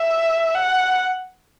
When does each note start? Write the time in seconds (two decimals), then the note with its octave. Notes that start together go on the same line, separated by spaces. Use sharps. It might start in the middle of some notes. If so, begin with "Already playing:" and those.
Already playing: E5
0.55 F#5